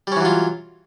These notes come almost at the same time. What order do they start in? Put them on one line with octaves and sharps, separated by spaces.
G3 C#4 E3 F#3 F4